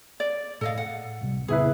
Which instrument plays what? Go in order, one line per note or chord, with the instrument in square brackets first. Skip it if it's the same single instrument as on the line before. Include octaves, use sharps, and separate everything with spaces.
[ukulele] D5
[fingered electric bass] A2 [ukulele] A4 D#5 F5
[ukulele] F#5
[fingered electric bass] C#2 C3 G3
[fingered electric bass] F2 A#2 C#3 [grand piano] B3 E4 B4 [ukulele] G#4